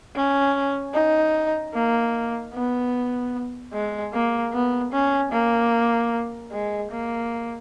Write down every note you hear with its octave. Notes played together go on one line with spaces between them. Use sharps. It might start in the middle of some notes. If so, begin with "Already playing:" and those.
C#4
D#4
A#3
B3
G#3
A#3
B3
C#4
A#3
G#3
A#3